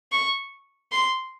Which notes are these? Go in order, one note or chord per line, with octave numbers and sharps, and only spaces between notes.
C#6
C6